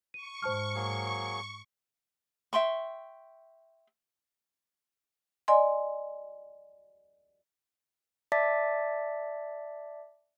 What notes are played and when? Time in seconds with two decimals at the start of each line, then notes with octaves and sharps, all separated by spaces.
0.14 C#6 D#7
0.43 G#2 C5 A5 F6
0.75 F#3 A#3 G#4
2.53 E5 G5 C6 C#6
5.48 D5 D#5 G#5 C6
8.32 D5 E5 A5 D6 A6 B6